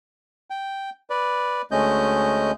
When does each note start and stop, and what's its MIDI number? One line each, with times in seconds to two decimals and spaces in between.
0.50 0.90 79
1.10 1.62 71
1.10 1.62 74
1.71 2.51 38
1.71 2.51 56
1.71 2.51 57
1.71 2.51 61
1.71 2.51 75
1.71 2.51 91